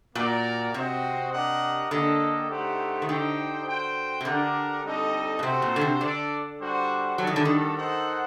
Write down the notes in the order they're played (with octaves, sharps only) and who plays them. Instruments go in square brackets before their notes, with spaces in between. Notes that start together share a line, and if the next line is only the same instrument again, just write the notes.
[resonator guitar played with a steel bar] A#2 [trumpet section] A#3 F#4 A#4 D5
[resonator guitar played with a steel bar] C3 [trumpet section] C4 F#4 C5 D#5 G5
[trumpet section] D4 G4 A#4 D#5 F#5
[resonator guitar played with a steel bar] D3 [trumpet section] A#3 D4 A4 D#5 G5
[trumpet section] A3 D#4 G4 C5 F#5
[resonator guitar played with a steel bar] D#3
[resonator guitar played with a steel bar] D3 [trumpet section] D#4 G4 C5 G5
[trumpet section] F#4 C5 G5
[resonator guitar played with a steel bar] C3
[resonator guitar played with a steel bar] D3 [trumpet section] D4 G4 A#4 F#5
[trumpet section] G3 C4 D#4 A4 D#5
[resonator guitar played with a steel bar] A#2
[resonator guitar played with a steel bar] C3 [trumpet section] C4 F#4 A4 C5
[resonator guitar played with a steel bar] A#2
D3
C3
[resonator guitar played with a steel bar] D3 [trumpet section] D4 A4 D5
[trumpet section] G3 D4 F#4 C5 F#5
[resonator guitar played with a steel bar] F#3 [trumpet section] G3 D4 F#4 A4
[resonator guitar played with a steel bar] D#3
D3
D#3
[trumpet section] D#4 A4 C5 F#5